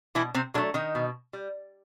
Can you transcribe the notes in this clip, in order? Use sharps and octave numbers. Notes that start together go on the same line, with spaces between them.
B2 E3 E4
C3 C4
D3 F#3 A3 D4
D#3 D#4
B2
G3